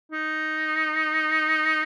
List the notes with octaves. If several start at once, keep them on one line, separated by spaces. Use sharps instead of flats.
D#4